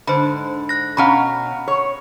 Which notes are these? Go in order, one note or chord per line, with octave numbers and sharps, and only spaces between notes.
G#2 D3 C5 B5
F#6 A#6
B2 C#4 F5 F#5 A#5 B5
C#5